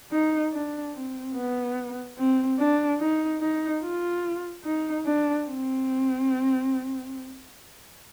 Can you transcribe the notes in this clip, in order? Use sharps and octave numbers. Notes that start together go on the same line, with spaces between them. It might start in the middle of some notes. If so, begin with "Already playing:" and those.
D#4
D4
C4
B3
C4
D4
D#4
D#4
F4
D#4
D4
C4